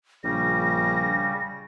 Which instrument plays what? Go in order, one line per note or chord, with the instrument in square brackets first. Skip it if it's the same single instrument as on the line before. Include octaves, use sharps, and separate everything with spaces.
[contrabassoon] A#1 [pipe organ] C#3 G3 [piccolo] A#6